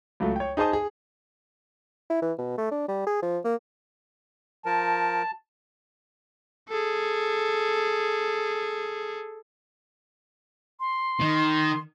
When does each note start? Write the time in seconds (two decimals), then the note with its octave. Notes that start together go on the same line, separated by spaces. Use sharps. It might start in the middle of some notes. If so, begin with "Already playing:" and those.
0.20 C#2 F#3 A3
0.36 C#5 G5
0.57 D#4 G#4 C5 A5 D#6
0.73 G#4
2.10 E4
2.22 E3
2.38 B2
2.58 A3
2.71 D4
2.88 G3
3.07 G#4
3.23 F3
3.44 A#3
4.65 F3 A#4 A5
6.69 G#4 A4
10.80 C6
11.20 D#3